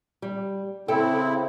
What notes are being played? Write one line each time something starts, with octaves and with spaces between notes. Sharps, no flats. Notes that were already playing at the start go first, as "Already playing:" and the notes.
G3
C#3 C4 E4 A4 G5